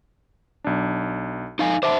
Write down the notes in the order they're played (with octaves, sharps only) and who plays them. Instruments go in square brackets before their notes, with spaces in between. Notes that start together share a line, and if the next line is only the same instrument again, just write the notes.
[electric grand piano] B1 D4
[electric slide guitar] D#4 F5 G#5
[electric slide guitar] C5 E5 A5 [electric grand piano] D6